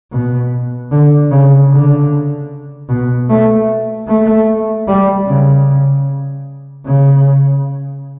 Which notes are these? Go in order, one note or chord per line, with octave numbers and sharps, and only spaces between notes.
B2
D3
C#3
D3
B2
A3
A3
G3
C#3
C#3